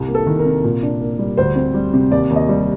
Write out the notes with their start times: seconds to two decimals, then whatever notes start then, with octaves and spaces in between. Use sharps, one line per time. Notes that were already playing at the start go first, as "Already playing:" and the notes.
Already playing: C2
0.08 A#3
0.15 A4
0.26 D#3
0.39 A#4
0.45 C3
0.64 A#2
0.83 D4
1.01 A#3
1.19 G3
1.37 D2 C5
1.56 C4
1.74 G3
1.94 C3
2.11 D#2 D5
2.30 D#2
2.36 D#5
2.49 G3